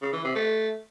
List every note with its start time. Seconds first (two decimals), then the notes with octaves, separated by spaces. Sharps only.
0.01 C#3
0.13 E3
0.24 C3
0.35 A3